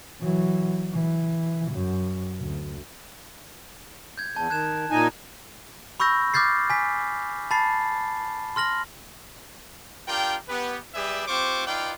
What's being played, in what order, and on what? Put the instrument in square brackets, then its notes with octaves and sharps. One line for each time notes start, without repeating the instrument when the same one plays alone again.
[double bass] E3 F#3
E3
F#2
D2
[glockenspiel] G6 G#6
[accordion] E2 [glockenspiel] A5 G6
[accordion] D#3 [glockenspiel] F#6 G#6 E7
[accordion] A#2 D#4 G#5
[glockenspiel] B5 C#6 E6 G6 A#6
D6 F6 G6 A6 C7
G#5 B6
A5 B5 A6 C7
C6 F6 A#6 F#7
[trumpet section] D4 F4 G4 A#4 G5
B3 G4 B4
G3 G4 G#4 B4 D5 E5
C4 F4 G4 C5 C#6 D6
D#4 F4 B4 D5 F5 G5